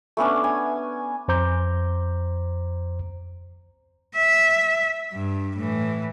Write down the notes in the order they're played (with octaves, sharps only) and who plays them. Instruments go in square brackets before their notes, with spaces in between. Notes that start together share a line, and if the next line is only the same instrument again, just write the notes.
[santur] A3 B3 C#4 D4
G#5
[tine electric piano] F2 C5 A#5 D6 G6
[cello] E5
G2
A2 E3